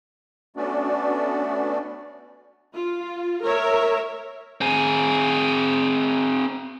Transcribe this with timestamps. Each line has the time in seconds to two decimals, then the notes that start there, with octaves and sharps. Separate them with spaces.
0.56 A3 B3 C#4 D4 F#4 D5
2.73 F4
3.43 A#4 C#5 E5
4.61 C4 G#4